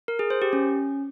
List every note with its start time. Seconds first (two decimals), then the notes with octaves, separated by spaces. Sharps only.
0.08 A#4
0.19 G#4
0.30 C5
0.42 G4
0.53 C#4